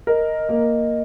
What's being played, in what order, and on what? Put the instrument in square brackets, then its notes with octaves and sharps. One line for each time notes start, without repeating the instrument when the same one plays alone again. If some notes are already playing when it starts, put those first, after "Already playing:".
[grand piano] A#4 [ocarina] D#5
[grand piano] A#3